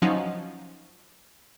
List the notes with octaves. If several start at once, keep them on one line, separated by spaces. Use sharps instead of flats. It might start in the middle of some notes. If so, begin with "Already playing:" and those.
F3 F#3 C#4 D#4